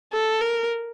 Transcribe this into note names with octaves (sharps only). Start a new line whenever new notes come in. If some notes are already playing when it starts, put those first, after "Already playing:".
A4
A#4